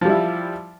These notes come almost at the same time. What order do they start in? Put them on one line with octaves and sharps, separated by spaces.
F3 G3 E4